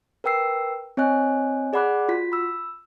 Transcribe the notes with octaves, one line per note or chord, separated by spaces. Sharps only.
A#4 B4 G5 E6 C7
C4 C#5 D#5 G#5 F#6
G#4 D5 F#5 B5 D6 F#6
F4 F#4 B6
B5 E6